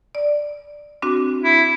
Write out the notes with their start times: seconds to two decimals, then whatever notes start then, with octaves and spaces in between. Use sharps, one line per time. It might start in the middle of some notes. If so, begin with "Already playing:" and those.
0.15 D5
1.02 C4 D4 F#4
1.42 E4